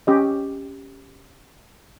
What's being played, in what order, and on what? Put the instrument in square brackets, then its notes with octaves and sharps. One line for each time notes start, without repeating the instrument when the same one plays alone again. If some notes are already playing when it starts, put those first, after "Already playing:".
[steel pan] C#4 G4 D#5